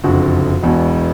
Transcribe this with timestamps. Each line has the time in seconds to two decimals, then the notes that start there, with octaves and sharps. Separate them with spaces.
0.04 F#1 F2 D3 F#4
0.63 E1 E2 B2